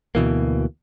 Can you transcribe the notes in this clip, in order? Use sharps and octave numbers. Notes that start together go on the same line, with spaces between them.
D2 B2 E3 A#3